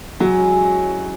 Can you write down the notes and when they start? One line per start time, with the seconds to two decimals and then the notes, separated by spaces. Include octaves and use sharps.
0.20 F#3 G#3
0.38 C#4 E4